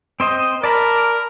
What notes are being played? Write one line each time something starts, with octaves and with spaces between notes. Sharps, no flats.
C4 C5 D#5
A#4 D5 A5 B5